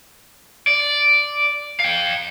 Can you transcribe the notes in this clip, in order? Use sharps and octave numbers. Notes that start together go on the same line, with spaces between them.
D5
F5 G5